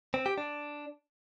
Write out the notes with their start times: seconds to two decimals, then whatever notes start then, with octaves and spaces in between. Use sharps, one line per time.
0.14 C4
0.26 G4
0.38 D4